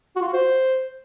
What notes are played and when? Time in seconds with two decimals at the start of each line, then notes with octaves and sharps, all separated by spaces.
0.16 F#4
0.22 F4
0.28 F#4
0.33 C5